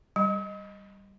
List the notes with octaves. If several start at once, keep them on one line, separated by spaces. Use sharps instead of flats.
G3